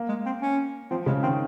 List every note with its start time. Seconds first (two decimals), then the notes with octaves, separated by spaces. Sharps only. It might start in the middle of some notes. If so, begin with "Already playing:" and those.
Already playing: A#3
0.09 G#3
0.26 C4
0.42 C#4
0.91 F3 C4
1.06 C#3 G#3
1.23 D#3 C4